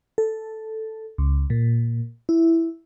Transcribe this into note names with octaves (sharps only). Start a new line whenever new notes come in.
A4
C#2
A#2
E4